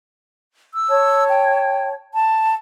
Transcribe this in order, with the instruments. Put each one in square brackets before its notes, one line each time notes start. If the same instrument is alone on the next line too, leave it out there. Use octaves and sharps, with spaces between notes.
[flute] E6
[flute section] C#5 A5
[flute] G5
A5